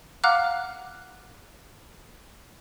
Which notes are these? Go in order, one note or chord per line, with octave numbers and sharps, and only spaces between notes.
F5 F#5 A#5 D6 F6 F#6